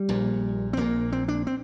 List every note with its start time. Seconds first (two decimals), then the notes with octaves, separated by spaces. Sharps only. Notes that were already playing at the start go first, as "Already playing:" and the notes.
Already playing: G3
0.09 A#1 A#2
0.73 C4
0.77 A#1 A#2 A#3
1.13 C4
1.28 D4
1.47 C4